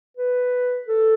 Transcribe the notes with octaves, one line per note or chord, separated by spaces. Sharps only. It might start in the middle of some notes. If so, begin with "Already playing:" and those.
B4
A4